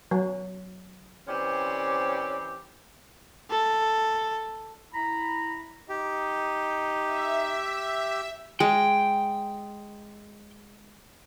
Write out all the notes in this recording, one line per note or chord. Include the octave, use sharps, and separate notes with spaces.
F#3
E3 C4 C#4 G4 C5 D5
A4
E4 A#5 B5
D#4 G4
E5
G#3 G5